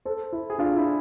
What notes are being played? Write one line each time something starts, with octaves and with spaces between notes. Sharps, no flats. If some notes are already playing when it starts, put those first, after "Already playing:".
A4 C5
E4
G#4
D4 F4
D4
E4